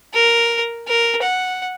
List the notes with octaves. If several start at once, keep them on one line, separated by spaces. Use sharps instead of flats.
A#4
A#4
F#5